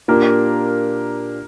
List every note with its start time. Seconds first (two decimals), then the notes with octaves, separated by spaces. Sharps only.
0.08 A#2 A#3 D4 G4 A#4